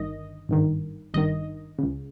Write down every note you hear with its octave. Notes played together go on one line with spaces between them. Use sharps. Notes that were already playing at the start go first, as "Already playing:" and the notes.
Already playing: G1 G2 D#3 D#5
G#1 G2 D#3
G#1 G2 D#3 D#5
C#2 C#3